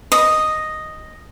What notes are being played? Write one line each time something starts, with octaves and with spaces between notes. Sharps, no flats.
D#5